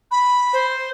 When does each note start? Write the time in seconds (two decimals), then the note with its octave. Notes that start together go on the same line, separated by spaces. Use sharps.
0.11 B5
0.53 C5